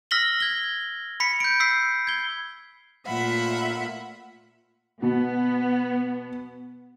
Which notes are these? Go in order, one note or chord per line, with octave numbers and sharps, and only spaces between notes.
E6 F6 A#6 B6 F#7 G7
G#6 G7
B5 B6 C#7
G6 D7
E6 B6 C7
G#6 G7
A#2 A3 F4 E5 F#5 B5
B2 B3